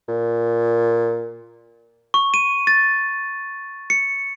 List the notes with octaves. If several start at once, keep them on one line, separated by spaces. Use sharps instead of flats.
A#2
C#6
D#7
A6
C#7